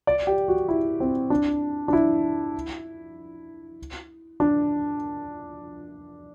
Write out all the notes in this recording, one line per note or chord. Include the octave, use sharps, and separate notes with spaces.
D5
G4
F#4
E4
C4
D4
D4
E4
D4